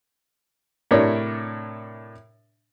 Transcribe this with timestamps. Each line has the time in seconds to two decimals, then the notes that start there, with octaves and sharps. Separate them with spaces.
0.91 A2 C3 D4 A#4 C#5 D5